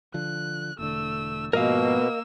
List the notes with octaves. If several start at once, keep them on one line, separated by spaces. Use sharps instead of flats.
D3 F3 F#6
E1 D3 A3 E6
G#2 B2 F3 A#3 A#4 D#5 F5 E6